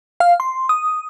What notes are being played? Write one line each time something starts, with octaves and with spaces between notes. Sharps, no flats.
F5
C6
D#6